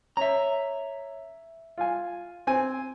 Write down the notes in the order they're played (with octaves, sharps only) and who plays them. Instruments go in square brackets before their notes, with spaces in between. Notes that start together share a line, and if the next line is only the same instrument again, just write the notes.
[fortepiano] C#4 [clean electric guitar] E5 A#5
[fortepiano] F4 F5 G#5
C4 G#5